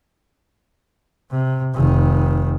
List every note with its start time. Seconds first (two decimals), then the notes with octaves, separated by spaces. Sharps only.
1.31 C3
1.75 F1 D#3